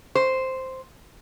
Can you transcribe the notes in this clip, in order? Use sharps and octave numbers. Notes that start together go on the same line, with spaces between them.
C5